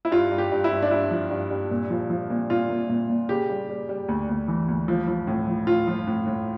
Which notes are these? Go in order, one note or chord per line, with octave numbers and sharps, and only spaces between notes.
E4
G2 F4
G2
G4
G2
E4
G2
D4
G2 E4
F3
G2
G2
A#2
F3
F3
A#2
A#2 F4
A#2
A#2
A#2
C#3 G4
G3
G3
G3
D2
D2
E3
D2
F3
F3
A2
F3
A2 F4
F3
A2
A2